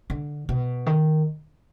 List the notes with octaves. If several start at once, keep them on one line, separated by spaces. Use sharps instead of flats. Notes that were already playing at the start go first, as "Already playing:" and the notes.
D3
B2
D#3